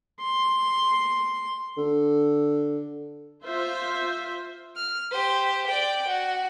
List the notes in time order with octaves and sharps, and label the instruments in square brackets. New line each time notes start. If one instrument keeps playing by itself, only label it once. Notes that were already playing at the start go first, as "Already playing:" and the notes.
[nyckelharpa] C6
[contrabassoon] D3
[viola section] F4 C5 E5
[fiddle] F6
G4 C5
D5 G5
F#4